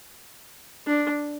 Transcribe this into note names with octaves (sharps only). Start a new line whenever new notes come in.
D4